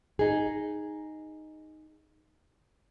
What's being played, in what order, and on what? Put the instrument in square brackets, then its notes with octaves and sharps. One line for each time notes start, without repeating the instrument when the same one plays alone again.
[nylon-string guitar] D#4 G#4